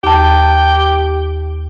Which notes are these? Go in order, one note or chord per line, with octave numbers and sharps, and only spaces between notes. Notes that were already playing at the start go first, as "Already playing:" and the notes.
D#2 G4 A5